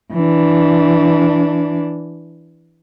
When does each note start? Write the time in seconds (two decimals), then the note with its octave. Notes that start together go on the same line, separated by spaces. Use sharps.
0.13 E3 D4